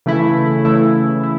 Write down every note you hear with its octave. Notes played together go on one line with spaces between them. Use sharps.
C#3 E3 A3 E4
C#3 E3 A3 E4
E4